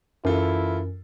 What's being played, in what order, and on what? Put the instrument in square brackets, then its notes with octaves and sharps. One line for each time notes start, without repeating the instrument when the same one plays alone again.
[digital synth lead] F#2 [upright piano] E3 F4 A4 [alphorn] E4